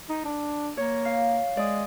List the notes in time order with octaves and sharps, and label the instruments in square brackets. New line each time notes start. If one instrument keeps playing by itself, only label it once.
[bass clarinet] D#4
D4
[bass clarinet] A#3 [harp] C#5
[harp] F5
[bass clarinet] G#3 [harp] D5 D#6